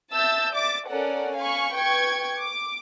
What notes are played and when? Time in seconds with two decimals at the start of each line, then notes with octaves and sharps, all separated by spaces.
0.12 E5 A5 E6 G6 A6
0.54 D5 E5 D6 A6
0.88 C#4 A4 A#4 D5 F#5
1.36 F5 G#5 B5 C#6
1.74 B4 G5 C#6 G#6
2.39 D6